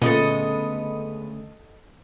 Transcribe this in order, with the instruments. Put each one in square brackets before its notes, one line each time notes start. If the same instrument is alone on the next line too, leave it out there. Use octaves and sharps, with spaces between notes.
[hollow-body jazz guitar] D2 G2 C#3 [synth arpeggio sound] A#2 [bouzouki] G#3 B3 [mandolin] A4 D#5